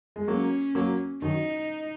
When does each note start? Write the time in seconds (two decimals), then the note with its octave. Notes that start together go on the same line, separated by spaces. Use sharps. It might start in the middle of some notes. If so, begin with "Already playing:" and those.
0.16 G#3
0.27 F#3 A#3 C#4
0.75 F#3 A#3
1.22 D#3 F#3 D#4